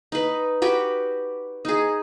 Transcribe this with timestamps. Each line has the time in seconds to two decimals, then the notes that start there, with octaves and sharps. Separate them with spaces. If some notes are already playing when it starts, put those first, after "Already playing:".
0.12 D#4 B4
0.62 F#4 G4 B4
1.65 D#4 G#4